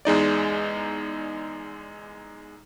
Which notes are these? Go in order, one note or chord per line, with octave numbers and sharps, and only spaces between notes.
E2 G#3 D#4 D5